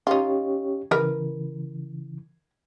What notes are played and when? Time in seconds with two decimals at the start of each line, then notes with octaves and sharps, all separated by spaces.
0.07 C#4 D#4 F4 G4 C#5
0.91 C#3 E3 A#4 B4